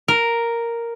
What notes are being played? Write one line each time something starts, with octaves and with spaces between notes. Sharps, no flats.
A#4